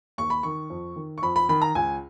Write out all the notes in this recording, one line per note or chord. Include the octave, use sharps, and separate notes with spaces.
D#2 C#6
B5
D#3 C#6
F2
D#3
C#6
F2 B5
B5
D#3 B5
A#5
C#2 G#5